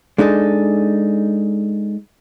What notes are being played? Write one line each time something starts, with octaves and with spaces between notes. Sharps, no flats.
G#3 D4 D#4 G#4 A4